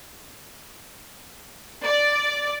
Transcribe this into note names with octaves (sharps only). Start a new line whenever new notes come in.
D5